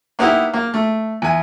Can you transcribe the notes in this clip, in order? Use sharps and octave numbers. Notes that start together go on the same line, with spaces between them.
A#3 B3 D#4 E4 G4
A#3
A3
E2 G#5